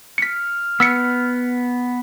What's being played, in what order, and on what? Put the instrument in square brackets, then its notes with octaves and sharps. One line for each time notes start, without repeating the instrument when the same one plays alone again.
[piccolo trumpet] F6 [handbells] B6 C#7
[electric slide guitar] B3 [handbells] E6 B6 C#7